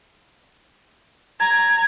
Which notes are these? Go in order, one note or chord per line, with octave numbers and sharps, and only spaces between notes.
A#5 G#6